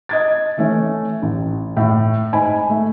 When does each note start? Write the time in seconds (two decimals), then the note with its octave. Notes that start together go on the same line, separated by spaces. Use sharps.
0.09 D#5 G#6 A6
0.57 E3 A3 C#4
1.22 A1
1.77 A2
2.33 G#2 G#5 B5
2.70 A3